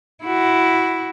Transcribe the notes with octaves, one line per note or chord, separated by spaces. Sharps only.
E4 F#4